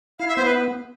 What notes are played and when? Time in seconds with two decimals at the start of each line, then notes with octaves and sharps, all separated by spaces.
0.19 E4 F5
0.28 E5
0.37 B3 C5
0.46 B4